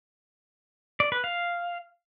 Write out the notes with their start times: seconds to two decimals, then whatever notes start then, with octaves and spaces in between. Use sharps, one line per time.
1.00 D5
1.12 B4
1.24 F5